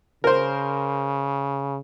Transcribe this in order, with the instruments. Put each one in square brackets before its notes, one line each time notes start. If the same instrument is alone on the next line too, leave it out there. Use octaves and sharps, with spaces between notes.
[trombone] C#3 [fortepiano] A#4 C5